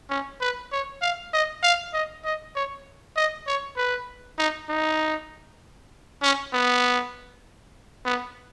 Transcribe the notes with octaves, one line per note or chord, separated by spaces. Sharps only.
C#4
B4
C#5
F5
D#5
F5
D#5
D#5
C#5
D#5
C#5
B4
D#4
D#4
C#4
B3
B3